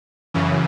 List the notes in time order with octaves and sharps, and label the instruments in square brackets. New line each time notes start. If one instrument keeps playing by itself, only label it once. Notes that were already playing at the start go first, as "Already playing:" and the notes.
[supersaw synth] F#2 C#3 E3